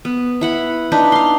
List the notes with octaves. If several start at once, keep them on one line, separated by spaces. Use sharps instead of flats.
B3
E4 F#5 B5
D4 D#4 B4
F5 C6